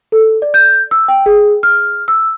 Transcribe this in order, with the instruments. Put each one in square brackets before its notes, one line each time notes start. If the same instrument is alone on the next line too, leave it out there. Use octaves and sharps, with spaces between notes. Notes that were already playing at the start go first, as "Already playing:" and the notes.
[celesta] A4
D5
G6
E6
G5
G#4
F6
E6